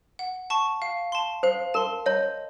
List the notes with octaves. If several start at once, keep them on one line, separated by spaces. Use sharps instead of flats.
F#5
A5 C#6
F5
A5 C6
C5 F5
A#4 A5 C6
C#5 D#5